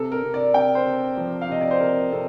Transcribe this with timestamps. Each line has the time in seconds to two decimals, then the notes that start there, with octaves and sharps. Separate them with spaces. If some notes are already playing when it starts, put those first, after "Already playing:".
Already playing: C3 A4
0.12 A#4
0.23 C3
0.34 D5
0.54 C3 G5
0.75 C5
0.85 C3
1.17 F3
1.42 F5
1.49 C3 D#5
1.61 D5
1.71 C5
1.80 C3 A#4
2.12 C3 A4